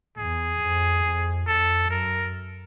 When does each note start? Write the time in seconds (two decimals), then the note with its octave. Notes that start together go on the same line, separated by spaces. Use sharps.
0.18 E2 G#4
0.61 F2
1.04 F2
1.47 F2 A4
1.89 F#2 A#4